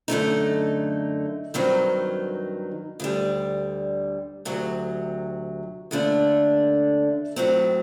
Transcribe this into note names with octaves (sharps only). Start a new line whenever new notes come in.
F#2 D3 A3 D#4
G2 D#3 F#3 C4 D#4
D2 D3 G3
D2 C3 F#3
D#2 D3 A3 D4
A2 F#3 C4